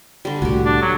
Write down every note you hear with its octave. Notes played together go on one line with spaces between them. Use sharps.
D3 G3
C2 A2 F#4 G4
D4
F#3